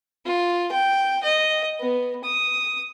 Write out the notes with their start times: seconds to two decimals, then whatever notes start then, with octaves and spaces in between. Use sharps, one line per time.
0.26 F4
0.72 G5
1.23 D#5
1.80 B3
2.24 D#6